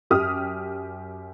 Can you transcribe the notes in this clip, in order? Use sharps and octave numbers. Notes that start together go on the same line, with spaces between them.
F#2 G4 D#6 F6